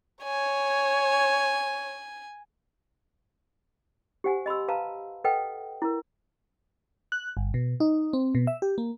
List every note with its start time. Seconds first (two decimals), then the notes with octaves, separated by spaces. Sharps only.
0.24 C#5 G#5
4.24 G4 C5 F#5 G#5
4.46 D#5 B5 C6 E6
4.68 B4 F5 A5 A#5
5.24 A4 B4 D#5 F#5 G5
5.82 E4 A#4
7.12 F#6
7.37 G1
7.54 B2
7.80 D#4
8.13 C4
8.35 B2
8.47 E5
8.62 G4
8.78 A#3